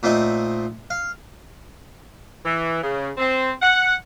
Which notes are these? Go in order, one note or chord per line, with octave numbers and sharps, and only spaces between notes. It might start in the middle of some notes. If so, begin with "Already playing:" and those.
A#2 A3 C4 D#4
F5
E3
C#3
C4
F#5